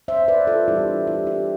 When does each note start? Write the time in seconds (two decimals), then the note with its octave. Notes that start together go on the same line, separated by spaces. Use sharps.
0.08 C5 E5
0.28 B4 D5
0.47 F4 A4
0.68 E3 G3 B3 D4 E4 G4
1.07 E4 G4
1.27 E4 G4